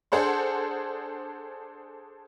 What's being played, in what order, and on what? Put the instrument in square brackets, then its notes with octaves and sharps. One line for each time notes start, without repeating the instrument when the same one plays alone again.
[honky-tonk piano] D4 G#4 A4 C5 F#5 C6